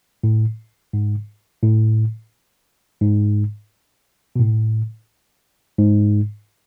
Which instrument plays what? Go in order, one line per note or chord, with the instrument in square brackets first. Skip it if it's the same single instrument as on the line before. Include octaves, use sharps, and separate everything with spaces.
[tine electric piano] A2
G#2
A2
G#2
B2
A2
G#2